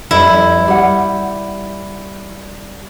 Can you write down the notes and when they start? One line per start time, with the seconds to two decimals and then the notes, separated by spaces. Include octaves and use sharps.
0.11 F2 G3 E4
0.68 G3 F#5